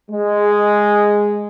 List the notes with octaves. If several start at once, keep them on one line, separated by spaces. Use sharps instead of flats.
G#3